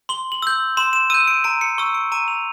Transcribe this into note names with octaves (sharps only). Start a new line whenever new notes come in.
C6 G7
F#7
E6 G6
C6 E7
E7
E6 G6 D#7
D7
A#5 D7
C#7
C#6 E6
D7
A#5 D#7
F7